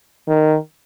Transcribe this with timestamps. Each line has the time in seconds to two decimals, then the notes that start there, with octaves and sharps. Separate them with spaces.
0.28 D#3